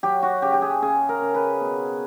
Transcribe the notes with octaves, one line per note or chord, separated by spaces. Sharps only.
F#3 G4
F#4
C#3 G4
G4
G#4
C#3 G#4
A#4
C#3
B4
B2